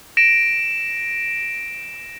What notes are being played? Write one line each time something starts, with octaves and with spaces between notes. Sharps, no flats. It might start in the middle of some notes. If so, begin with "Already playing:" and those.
A#6 D7 E7